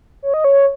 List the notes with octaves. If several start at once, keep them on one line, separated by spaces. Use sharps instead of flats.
C#5
D#5
C#5